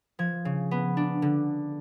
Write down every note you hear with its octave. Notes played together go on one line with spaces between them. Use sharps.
F3 G#6
C#3
B3
D4
D3